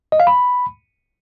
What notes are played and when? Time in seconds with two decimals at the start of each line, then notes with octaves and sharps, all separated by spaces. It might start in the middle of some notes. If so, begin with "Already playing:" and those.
0.12 D#5
0.20 F5
0.27 B5